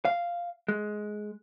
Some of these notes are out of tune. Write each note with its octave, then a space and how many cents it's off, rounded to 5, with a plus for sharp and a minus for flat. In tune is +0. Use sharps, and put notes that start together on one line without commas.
F5 -5
G#3 +15